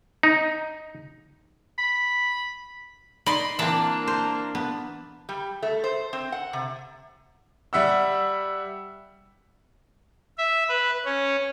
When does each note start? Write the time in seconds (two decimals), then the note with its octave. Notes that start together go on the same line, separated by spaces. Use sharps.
0.23 D#4
1.78 B5
3.26 D#4 D5 B5 C6
3.59 E3 A#3 C4 D4
4.07 C5
4.55 B3
5.29 G3
5.63 A3
5.84 C5
6.13 C4
6.32 F#5
6.53 C3
7.73 G3 E5 F#5 E6
10.38 E5
10.69 B4
11.05 C#4